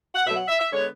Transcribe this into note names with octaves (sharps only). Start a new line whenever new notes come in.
F#5
B2 F#3 A3 E5
F#5
E5
E5
D3 G#3 B3 C#5